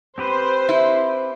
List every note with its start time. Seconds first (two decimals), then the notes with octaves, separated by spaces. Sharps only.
0.18 C4 G4 B4 C5
0.69 E4